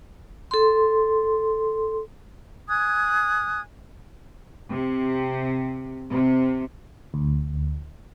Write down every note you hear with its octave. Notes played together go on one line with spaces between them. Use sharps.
A4 C6
G#5 D#6 F#6 G#6
C3
C3
D2